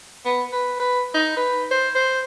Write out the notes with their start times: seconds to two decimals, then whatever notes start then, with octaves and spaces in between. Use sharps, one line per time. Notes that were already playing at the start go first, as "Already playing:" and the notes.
0.25 B3
0.52 B4
0.80 B4
1.14 D#4
1.36 B4
1.71 C5
1.95 C5